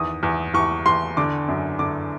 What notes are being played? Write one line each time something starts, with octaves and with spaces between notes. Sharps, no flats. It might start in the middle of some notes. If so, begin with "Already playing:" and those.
Already playing: E2 D#3 D#6
E2
E2 C#6
E2 C6
D3 D6
F#2
D3 D6